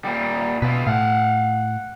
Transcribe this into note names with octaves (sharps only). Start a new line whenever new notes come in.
A#2 G3
B2 F4 B4
A2 F5 F#5